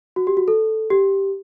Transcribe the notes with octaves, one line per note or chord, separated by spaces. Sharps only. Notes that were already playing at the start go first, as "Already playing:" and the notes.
F#4
G4
F#4
A4
G4